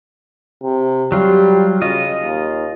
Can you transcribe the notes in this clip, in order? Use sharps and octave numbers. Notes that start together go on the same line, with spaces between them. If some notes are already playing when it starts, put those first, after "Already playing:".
C3
F#3 G3 F4
C#3 F4 D#5
D#2